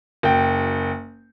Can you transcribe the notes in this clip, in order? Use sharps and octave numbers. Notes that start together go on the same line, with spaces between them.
F#1 G5